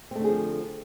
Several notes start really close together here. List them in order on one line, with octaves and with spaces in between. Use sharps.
C4 A3 D3 G#4 F3